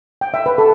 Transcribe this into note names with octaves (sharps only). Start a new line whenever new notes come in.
G5
E5
B4
A4